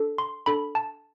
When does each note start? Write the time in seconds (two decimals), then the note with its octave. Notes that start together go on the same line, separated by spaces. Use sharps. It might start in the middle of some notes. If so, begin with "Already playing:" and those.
Already playing: D4 A4
0.18 C6
0.46 D4 A4 B5
0.75 A5